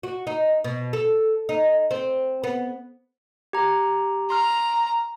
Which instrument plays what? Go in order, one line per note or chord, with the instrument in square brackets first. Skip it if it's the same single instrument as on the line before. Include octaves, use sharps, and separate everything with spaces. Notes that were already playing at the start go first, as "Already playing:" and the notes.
[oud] F#4
D#4
B2
A4
D#4
C4
B3
[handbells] G4 A#5
[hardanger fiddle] A#5 [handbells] C6 F6